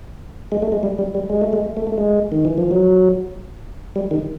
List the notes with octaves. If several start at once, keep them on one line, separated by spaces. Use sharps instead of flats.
G#3
A3
G#3
G3
G3
G3
G#3
A3
G#3
A3
A3
G#3
D#3
E3
F3
F#3
G3
D#3